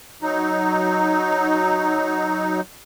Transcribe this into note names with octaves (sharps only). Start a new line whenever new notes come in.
F#3 D#4